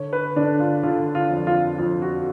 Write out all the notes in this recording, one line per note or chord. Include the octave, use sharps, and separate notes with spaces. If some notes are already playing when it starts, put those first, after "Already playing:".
Already playing: D3 C#5
B4
D3 D4
F4
D3 F4
F4
F2
F4
F2 F4
F#4